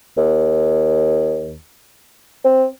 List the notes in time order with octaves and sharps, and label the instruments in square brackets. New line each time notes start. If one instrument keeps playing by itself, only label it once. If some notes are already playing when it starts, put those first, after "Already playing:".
[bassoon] D#2
C4